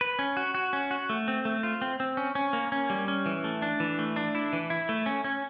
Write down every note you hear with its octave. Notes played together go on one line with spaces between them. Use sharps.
B4
C#4
F#4
F#4
C#4
F#4
A3
C4
A3
F4
C4
C4
C#4
C#4
A#3
C#4
G3
C#4
E3
A3
D4
E3
A3
D4
E4
E3
E4
A3
C#4
C#4